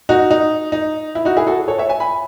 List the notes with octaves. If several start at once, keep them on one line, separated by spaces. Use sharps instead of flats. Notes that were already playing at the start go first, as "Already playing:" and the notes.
D#4 F#4
D#4
D#4
E4
D#4 F#4
E4 G#4
F#4 A4
A4 C#5
C#5 E5
E5 G#5
G#5 B5